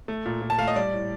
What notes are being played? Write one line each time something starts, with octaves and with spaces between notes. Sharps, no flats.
A3
A#2
A#2
A5
A3 F5
D#5
G3 D5
A2